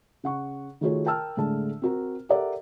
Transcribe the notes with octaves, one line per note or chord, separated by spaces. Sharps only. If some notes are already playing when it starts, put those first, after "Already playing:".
C#3 F#5 C#6
D#3 A3 F4 F#4 G#4 C#5
A#4 G5 A5 E6 F6
A2 D3 G#3 A5
C4 F#4 A#4
G4 A4 A#4 D5 E5 F#5